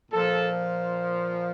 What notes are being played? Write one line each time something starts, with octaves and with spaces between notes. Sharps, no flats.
A#2 F3 A4